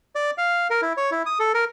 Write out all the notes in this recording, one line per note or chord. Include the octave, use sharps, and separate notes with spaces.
D5
F5
A#4
E4
C#5
E4
D#6
A4
A#4